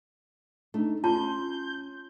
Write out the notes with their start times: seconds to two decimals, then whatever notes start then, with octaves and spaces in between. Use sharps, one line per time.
0.74 A3 D4 D#4
1.04 C#4 F4 A5 C6 G6